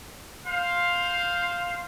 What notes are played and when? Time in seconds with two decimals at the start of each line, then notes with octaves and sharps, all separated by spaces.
0.46 C5 F5